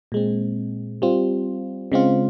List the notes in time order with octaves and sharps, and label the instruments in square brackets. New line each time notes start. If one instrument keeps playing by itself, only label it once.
[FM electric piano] A#2 G#3 C4
G3 C4 F4
C#3 G#3 C4 F4